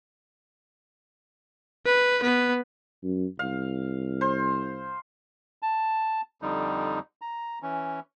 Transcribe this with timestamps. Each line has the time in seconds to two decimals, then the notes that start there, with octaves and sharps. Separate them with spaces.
1.86 B4
2.22 B3 B4
3.03 F#2
3.39 C2 F5
4.21 C5
5.62 A5
6.42 F2 D3 G3 D#4
7.22 A#5
7.62 E3 C#4